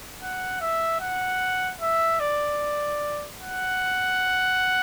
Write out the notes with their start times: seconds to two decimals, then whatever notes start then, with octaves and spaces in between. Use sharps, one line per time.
0.21 F#5
0.61 E5
1.00 F#5
1.81 E5
2.20 D5
3.39 F#5